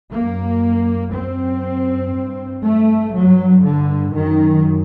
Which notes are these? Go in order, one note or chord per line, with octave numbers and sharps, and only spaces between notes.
F#2 A#3
F#2 C4
G2
A3
G2 F#3
D3
F#2 D#3